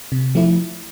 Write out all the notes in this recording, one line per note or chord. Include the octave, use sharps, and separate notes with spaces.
C3
F3 A3 E4